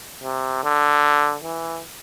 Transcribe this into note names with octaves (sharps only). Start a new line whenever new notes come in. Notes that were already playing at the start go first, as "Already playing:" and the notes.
C3
D3
E3